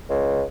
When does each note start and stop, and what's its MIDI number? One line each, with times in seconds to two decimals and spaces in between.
0.10 0.43 37